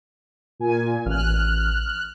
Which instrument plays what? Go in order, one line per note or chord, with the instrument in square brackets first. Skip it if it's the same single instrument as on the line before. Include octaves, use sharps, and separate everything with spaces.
[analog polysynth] A#2 G#5
[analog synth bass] A1 [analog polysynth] F6 F#6